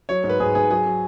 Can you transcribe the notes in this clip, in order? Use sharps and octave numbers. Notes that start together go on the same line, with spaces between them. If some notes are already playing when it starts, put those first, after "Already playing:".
F#3 C#5
G#2
B4
G#2 G#4
G#2 G#4
F#3 G#4
F#3